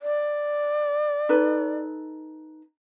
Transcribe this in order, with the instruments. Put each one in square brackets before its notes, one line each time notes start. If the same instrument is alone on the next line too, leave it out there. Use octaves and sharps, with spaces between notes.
[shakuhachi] D5
[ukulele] D#4 A4 B4